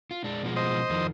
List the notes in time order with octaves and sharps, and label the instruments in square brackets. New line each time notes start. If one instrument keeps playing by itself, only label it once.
[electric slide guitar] F4
G#3 D4
B2 F3 G#3
[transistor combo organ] C5 D#5
[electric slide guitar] F2 D#3 F3